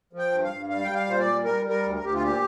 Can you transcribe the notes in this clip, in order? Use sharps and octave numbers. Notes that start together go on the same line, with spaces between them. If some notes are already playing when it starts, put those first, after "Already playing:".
F3
G5
G2
F5
G2
G3 F5
G3 G5
F5
A#2 C5
D5
G3
G3 A#4
G3
A#4
D2
A#4
D2 G4
F4
A#2 G4